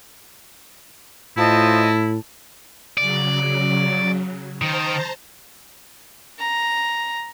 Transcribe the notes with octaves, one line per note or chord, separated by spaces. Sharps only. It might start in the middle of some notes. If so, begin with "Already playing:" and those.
A2 E4 F4 C5 D#5 A5
C#3 F#3 D5
D#3 C5 A5 A#5
A#5